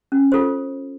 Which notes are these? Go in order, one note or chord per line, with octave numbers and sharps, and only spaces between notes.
C#4
F4 A4 C5